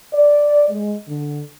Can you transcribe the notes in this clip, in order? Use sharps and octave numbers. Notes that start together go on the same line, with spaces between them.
D5
G#3
D3